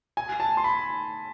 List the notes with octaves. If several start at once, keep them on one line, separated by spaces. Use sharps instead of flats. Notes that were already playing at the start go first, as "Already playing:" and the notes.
G#5
A5
C6
B5